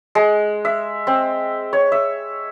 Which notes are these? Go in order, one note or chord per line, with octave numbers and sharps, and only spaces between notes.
G#3
E5
C4
C#5
E5